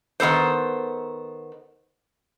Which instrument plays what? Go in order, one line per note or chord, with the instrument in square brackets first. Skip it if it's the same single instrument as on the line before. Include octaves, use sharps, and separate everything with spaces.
[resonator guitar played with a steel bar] D#3 B3 A4 C5